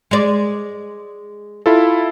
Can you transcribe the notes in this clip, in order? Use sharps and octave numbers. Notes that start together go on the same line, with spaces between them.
G#3 D5
E4 F4 A4